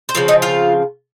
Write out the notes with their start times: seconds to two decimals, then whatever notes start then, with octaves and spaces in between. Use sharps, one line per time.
0.09 C5
0.15 C#3 F3 C4 C#5
0.28 D#4 D#5
0.42 F4 F5